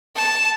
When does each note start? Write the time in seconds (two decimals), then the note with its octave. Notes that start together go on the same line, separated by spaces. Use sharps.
0.16 A5